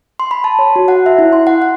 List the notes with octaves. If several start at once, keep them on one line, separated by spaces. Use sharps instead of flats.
C6
B5
A5
C#5
F#4
F#5
E5
E4
C6
F#5
F#5